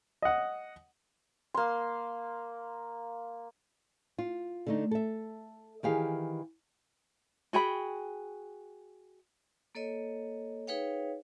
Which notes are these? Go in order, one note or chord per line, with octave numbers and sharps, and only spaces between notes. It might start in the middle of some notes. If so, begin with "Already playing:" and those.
D#5 F#5
A#3 C6
F4
D3 A3 D#4
A4 E5
D#3 E3 G4 G#4 F5
F#4 G#4 G5 B5
A#3 A4 C#5 D#5
D#4 G#4 B4 C#5 F5 G5